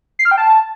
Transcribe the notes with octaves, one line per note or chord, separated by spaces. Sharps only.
C7
F6
G5
A5